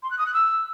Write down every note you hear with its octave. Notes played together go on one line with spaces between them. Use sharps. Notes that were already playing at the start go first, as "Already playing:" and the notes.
C6
F#6
D#6
F#6
E6